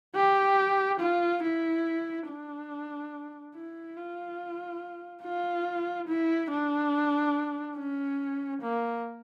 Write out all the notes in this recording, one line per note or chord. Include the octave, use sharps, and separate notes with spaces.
G4
F4
E4
D4
E4
F4
F4
E4
D4
C#4
A#3